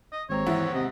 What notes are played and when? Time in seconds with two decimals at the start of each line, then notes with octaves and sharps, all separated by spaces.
0.12 D#5
0.29 G#1 D#2 C4 C#5 A#5
0.46 G#2 E3 B3 E4
0.74 C3 D#5